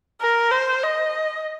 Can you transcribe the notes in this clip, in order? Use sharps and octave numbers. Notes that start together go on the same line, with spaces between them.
A#4
C5
D#5